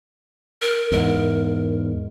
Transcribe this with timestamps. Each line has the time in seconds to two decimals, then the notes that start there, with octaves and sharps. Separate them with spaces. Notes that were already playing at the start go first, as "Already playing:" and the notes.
0.62 A#4
0.92 E2 G#2 A#4